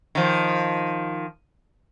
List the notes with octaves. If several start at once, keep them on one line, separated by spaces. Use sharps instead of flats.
D#3 F3